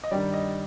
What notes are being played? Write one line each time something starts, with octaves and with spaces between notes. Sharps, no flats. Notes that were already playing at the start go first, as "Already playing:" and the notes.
D#5
G2 D#3 G3 D5
D#5